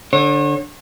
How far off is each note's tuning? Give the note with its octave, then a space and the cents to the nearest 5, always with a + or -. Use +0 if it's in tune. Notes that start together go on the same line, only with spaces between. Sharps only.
D3 +0 C#5 -40